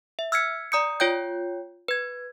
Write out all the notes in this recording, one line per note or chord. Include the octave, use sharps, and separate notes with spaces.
E5
E6 F6 G#6 B6 C#7
D5 A#5 D#6 G6 C#7
F4 C#5 G5 G6
B4 G#6